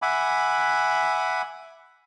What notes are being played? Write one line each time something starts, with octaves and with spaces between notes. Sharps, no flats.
E5 F#5 G#5 B5 D6